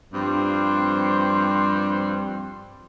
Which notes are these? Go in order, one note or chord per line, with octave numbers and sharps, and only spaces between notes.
G2 F3 G3 C4 C6